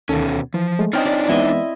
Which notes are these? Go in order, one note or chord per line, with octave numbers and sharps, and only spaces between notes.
D2 B2 D#3 C#4 A4
E3 F3
G#3 A3
C4 D4 D#4 C#5 D#5 G5 F6
D5
E3 G#3 B3 E4 D#5 E5